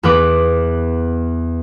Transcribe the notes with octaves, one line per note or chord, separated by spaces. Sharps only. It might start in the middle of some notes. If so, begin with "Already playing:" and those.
E2 B3 B4 D6